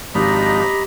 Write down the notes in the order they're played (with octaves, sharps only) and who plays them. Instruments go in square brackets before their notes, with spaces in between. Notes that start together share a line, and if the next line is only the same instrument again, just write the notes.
[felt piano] G#1 [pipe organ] F3 D4 D#4 [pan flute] G4 [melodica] D#5 A#5 B5